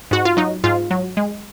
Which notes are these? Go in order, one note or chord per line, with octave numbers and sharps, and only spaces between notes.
G#2 F#4
F4
F#3 D#4
G#2 F4
F#3
G#3